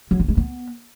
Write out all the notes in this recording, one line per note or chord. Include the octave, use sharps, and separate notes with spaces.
F#3
E3
G#3
B3